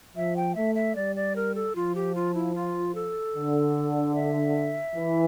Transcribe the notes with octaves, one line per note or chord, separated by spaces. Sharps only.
F3 E5
G5
A3 E5
E5
G3 D5
D5
A#4
A4
F3 F4
G4
F4
E4
F4
A4
D3
E5
E3